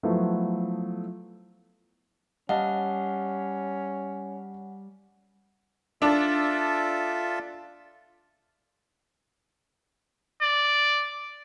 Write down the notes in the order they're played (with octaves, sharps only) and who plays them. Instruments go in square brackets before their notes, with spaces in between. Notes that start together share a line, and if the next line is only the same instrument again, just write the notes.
[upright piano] F3 F#3 A3 B3 E4
[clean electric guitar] G3 [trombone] C#4 [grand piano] D#5 F5 A5 [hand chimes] F#5
[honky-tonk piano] D4 [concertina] F4 A4 E5
[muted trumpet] D5